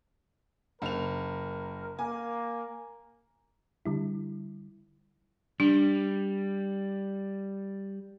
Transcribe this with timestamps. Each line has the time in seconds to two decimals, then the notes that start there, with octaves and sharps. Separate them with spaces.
0.82 F#1 A#4 F7
1.99 A#3 G#5
3.86 D3 G3 E4
5.60 G3 D4